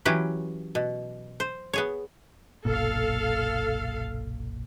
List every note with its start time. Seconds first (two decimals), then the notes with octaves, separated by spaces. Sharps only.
0.05 E3 F#3 C#4 G4 B4
0.75 B2
1.40 C5
1.74 B3 G#4 C#5
2.65 F#1 B1 A#2 A4 F5